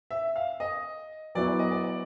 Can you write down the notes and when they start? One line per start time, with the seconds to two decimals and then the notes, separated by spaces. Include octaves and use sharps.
0.11 E5
0.36 F5
0.60 D#5
1.35 F#3 B3 E4 D5
1.48 D5
1.59 D#5
1.71 D5
1.84 D5